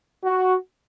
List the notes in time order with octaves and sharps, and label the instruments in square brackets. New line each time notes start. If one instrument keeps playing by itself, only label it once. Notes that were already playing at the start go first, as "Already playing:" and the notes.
[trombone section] F#4